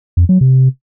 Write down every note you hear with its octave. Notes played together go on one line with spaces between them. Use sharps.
F2
F#3
C3